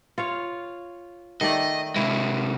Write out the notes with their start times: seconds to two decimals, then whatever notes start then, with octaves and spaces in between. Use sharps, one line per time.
0.18 F4 C#5 F5
1.41 D#3 A3 D5 D#5
1.96 C3 G#3 E4